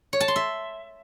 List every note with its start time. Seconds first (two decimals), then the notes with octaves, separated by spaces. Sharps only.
0.13 C#5
0.20 A5
0.28 C6
0.36 E5